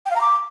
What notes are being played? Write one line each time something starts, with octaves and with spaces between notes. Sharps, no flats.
G5
F5
A#5
D6